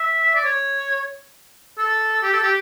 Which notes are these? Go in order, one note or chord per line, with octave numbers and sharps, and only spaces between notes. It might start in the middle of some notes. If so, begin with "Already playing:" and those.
Already playing: E5
D5
C#5
A4
G4
A4
G4